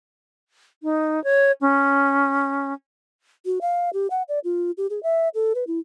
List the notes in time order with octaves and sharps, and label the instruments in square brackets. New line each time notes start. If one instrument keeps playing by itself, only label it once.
[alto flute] D#4
C#5
C#4
[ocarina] F#4
F5
G4
F#5
D5
F4
G4
G#4
E5
A4
B4
E4